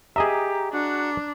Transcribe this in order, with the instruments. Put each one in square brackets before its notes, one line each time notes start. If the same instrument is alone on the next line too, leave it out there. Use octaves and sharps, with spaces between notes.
[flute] G4 [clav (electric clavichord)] G#4 D#5 E5 [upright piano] A#5
[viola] D4 [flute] F#4